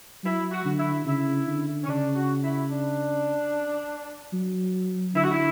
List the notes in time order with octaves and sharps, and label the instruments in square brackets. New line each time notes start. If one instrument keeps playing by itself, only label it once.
[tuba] F#3 [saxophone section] E4
[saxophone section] F#4
[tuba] D3
[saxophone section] E4
[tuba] C#3 [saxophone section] E4
[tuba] D3
[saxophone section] C#4
[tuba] C#3 [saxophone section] D4
[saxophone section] F#4
E4
D4
[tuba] F#3
[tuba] D3 [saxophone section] E4
[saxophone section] F#4
E4